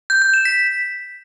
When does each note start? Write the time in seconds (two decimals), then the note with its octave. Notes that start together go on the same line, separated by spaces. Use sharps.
0.10 G6
0.22 G6
0.34 E7
0.45 B6